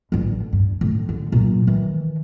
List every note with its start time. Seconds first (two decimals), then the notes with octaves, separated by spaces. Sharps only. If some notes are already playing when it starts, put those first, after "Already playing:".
0.12 A1 D3
0.53 G2
0.81 A2
1.09 D3
1.32 A#2 F#3
1.67 D#3 E3